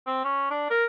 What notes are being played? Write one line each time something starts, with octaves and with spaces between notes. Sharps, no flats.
C4
C#4
D4
A#4